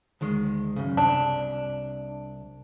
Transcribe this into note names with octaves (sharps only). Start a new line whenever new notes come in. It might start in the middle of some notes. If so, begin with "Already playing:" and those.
D2 D#3 G#3
F#2 C#3
C2 D4